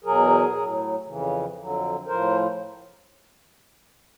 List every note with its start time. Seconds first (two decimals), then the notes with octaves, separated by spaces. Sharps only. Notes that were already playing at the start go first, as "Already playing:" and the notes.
0.04 E2 B2 F#3 G#4 A#4
0.54 A2 F#3
1.06 F2 C#3 E3
1.55 F2 D3 F#3
2.06 A2 F3 A#4 C5